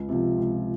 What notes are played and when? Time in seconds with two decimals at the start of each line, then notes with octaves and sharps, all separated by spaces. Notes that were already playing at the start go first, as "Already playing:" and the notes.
Already playing: C#2
0.09 C3 F3
0.39 C#2